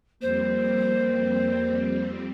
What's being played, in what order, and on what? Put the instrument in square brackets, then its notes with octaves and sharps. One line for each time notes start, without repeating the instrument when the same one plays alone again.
[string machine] F2 G3 C4 [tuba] A#3 [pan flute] C5